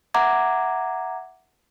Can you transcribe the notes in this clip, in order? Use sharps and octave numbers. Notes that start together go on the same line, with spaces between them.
E5 F#5 A#5 D6 G#6